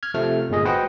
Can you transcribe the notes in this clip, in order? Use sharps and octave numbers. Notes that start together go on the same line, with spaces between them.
F6 G#6
C3 F3 A3 F6
G1 G2 A#2 G#3 G#4 D#5
F#4 B4 C5 D#5 F#5 G5